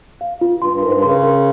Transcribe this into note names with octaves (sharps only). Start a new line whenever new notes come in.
F5
F4
G2 C6
G2
G#2 A#4
G2
C#3 C6
A#4